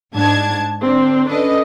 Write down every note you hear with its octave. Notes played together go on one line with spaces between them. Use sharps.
G#2 D4 A5 G#6
D3 C4 D4
C#4 D4 A4 B4 D#5